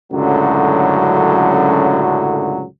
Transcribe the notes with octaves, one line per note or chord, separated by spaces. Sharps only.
C#2 F#2 A2 D3 F#3